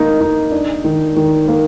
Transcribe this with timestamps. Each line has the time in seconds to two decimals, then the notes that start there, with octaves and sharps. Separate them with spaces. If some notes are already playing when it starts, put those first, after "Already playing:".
Already playing: A#3 D#4
0.20 D#4
0.52 D4
0.84 D#3
1.16 D#3
1.48 A#3